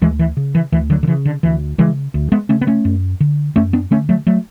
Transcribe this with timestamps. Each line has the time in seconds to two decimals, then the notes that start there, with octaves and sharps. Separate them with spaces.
0.01 D2 E3 G#3
0.19 E3
0.37 C#3
0.55 E3
0.72 D2 E3
0.90 D3 F#3
1.03 D3
1.07 C#3 E3
1.25 D3
1.43 D2 E3
1.78 C#3 E3 G#3
2.14 D2
2.32 G#3 B3
2.49 C#3 A3 C#4
2.61 B3
2.67 A3 C#4
2.85 F#2
3.20 D3
3.56 F#2 A3 C#4
3.73 B3 D4
3.91 D3 A3 C#4
4.09 F#3 A3
4.27 F#3 A3